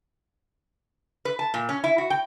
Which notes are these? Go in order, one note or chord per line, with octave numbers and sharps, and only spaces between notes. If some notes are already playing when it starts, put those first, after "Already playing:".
B4
A5
A#2
C#4
E4
F#4
G5